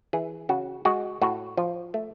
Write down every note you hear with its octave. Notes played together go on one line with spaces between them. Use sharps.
E3 G#4
C#3 F#4
G#3 F#4
A2 F#4
F3
A3